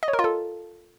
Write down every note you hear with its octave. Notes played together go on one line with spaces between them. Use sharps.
D#5
C#5
A#4
F4
A4